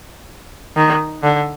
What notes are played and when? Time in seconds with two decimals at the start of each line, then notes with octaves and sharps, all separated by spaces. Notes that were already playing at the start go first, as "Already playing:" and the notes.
0.77 D#3
1.23 D3